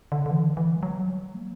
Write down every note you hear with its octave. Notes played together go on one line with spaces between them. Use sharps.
D3
D3
E3
E3
G3
F#3
G3
A#3